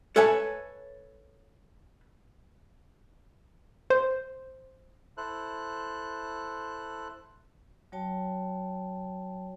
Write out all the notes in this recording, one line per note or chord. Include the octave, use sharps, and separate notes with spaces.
A4 B4 C#5 E5 G#5 A5
C5
E4 A4 C5 F#6
F#3 F#4 C#5 G5 A5